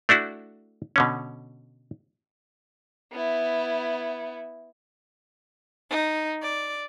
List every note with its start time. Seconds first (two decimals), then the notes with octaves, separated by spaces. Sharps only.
0.09 A3 D4 E4 F#4
0.96 B2 D3 C#4
3.12 B3 E4
5.90 D#4
6.43 D5